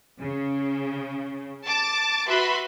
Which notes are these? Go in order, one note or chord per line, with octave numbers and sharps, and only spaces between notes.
C#3
A5 D6 A6
F#4 B4 E5 B5 C6